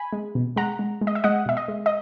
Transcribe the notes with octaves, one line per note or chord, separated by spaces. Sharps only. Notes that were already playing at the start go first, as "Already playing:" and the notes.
Already playing: G#5 B5
G#3
B2
G#3 F#5 A#5
G#3
G#3
D#5
E5
G#3 D#5 F#5
B2 E5
D#5
G#3
D#5